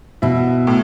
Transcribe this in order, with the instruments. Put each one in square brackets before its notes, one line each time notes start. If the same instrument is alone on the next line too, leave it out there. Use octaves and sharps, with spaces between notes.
[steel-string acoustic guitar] B2 [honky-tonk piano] E4
[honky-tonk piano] A2